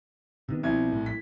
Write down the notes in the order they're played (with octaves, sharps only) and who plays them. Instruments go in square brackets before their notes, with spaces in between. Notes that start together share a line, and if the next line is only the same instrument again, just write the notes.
[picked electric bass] C3 D#3 B3
[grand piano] C2 G#6 [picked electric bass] B2 F3 C4
[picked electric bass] A#1 A2 A3
[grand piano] B6